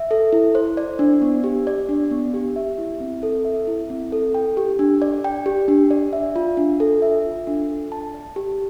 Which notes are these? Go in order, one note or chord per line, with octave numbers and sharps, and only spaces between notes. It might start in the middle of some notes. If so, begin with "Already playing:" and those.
Already playing: E5
A4
E4
C5
D5
D4
B3
G4
D5
D4
B3
G4
E5
E4
C4
A4
E5
E4
C4
A4
G5
G4
D4
D5
G5
G4
D4
D5
E5
F4
D4
A4
E5
F4
D4
A4
A5
D5
G4